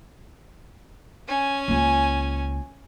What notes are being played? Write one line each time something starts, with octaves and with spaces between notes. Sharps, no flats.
C#4 G#5
C#2 A#3